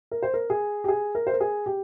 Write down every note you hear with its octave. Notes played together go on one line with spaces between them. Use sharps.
A#4
C5
A#4
G#4
G4
G#4
A#4
C5
A#4
G#4
G4